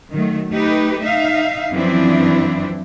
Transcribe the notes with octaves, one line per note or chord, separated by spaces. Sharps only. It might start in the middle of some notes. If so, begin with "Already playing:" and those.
D#3 F#3 A3
A3 D#4 G4 B4
D#4 E5 F5
F#2 E3 F3 C4 D4 E4